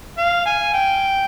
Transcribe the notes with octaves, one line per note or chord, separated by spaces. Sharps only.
F5
G#5
G5